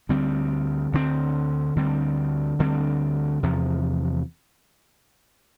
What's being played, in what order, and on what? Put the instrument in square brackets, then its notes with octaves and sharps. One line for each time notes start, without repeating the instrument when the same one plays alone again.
[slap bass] D2 D3 G3 C4
D2 D3 G3 C4
D2 D3 G3 C4
D2 D3 G3 C4
E2 C3 F3